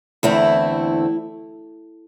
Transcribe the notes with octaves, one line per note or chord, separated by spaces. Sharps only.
E2 D3 A3 C4 E4